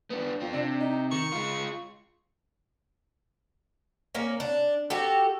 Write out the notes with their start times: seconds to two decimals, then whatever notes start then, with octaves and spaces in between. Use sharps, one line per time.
0.10 B3 D4
0.41 C4 F4
0.53 C3 D4
0.80 D#4
1.11 D#3 C#6
1.32 G#3 F4
4.15 A#3 C#4
4.40 D4
4.90 F#4 G4 A4